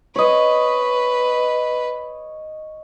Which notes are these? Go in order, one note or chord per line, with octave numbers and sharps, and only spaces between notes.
B4 C#5 D#5